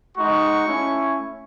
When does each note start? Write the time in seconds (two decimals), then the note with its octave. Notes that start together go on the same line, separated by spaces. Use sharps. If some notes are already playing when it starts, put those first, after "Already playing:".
0.16 G#3 D#4 F#4 C#6
0.67 A3 C#4 E4